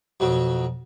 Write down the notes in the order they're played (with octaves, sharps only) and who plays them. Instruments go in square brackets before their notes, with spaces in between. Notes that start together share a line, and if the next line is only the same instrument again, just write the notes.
[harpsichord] F2 B2 F#3